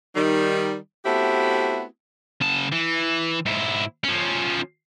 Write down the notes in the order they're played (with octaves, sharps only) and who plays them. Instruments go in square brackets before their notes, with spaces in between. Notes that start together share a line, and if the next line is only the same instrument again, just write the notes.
[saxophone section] D#3 G3 D#4
A3 B3 C4 E4 F#4 G4
[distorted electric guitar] C#3 A5
E3
G#2 E4
F3 C#4